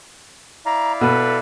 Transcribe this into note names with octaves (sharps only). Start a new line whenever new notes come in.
E4 D5 F5 A#5
B2 A4 B4